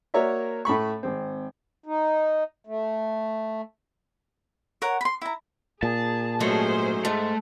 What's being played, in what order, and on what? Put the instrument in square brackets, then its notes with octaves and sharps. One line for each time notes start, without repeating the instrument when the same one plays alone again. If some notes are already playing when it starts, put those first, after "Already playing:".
[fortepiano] A#3 F#4 A#4 C#5 D5 E5
A2 A3 B5 C#6
G#1 C4
[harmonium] D#4
A3
[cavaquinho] A#4 C#5 F#5
B5 C6
E4 A#5
[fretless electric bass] A#2 [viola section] G#4 [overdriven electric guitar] A5
[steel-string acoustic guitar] G#2 F#3 A3 [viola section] C#4 G#4 C5
[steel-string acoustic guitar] G#2 [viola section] G#3 [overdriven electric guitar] A3